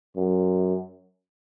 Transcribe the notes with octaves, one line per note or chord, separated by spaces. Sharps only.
F#2